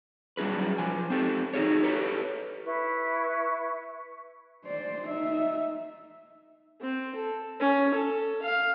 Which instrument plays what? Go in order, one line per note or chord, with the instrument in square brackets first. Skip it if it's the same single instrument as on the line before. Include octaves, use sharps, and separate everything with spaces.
[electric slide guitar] F#3 G3 C#4 G#4 B4
F3 G#5
C4 G4 A4
D#4 F#4 G#4 C#5
G4 A4 B4 C#5
[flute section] E4 B4 C#6
[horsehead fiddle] C5 D5
D#4 E5
[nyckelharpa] C4
A4
C#4
A4
F5